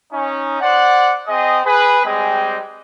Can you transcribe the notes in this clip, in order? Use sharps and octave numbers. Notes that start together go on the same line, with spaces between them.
C#4 D#4
C5 D5 F#5
C4 G#4 D#5
G#4 B4
G3 G#3 C4 G#4 D#5